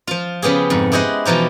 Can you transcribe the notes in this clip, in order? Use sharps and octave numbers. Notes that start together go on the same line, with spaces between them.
F3 F4
C#3 F3 B3 G4 G#4
F2 G#2
E4 G4 G#4 C5 D#5 F#5
B2 E3 F3 D#4 G4